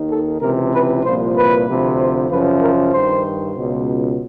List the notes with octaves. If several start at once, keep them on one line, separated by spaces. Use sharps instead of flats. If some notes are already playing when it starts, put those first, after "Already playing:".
Already playing: D#2 D#3
A4
C#2 C3 E3 A#4
B4
C2 A#2 F3 C5
B4
D2 C3 F3
C5
F#2 C#3 F3 B4
A#4
G2 D#3 C5
C#2 B2